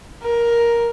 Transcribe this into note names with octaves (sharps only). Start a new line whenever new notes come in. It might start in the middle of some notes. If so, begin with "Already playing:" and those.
A#4